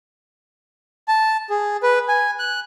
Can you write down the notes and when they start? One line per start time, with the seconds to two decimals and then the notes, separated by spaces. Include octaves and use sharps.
1.08 A5
1.50 G#4
1.83 B4
2.08 G#5
2.39 F#6